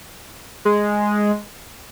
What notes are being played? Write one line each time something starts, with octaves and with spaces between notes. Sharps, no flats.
G#3